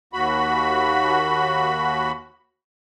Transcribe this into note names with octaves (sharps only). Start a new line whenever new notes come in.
D#2 F#4 B5